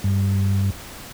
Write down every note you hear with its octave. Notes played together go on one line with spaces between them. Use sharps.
G2